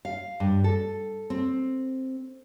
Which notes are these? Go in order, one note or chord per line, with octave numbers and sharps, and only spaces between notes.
F5
G2
A4
C4